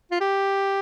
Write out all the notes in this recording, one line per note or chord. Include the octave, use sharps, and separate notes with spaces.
F4
G4